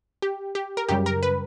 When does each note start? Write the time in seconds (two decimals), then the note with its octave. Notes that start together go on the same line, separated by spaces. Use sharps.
0.22 G4
0.55 G4
0.77 A#4
0.89 F#2 C#3 G3 G4
1.06 A#4
1.23 B4